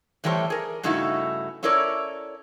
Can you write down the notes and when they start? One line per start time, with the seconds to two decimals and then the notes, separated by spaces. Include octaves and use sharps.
0.24 A2 E3 G3 A3 C5 C#5
0.50 G#4 A#4
0.83 G2 C#3 A3 D#4 E4 F#4
1.63 C#4 E4 A4 A#4 C#5 D5